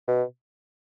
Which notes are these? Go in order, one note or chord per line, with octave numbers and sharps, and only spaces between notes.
B2